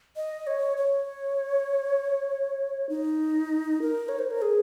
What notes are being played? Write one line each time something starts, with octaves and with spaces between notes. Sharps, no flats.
D#5
C#5
C#5
D#4
A#4
C#5
C5
A#4
G#4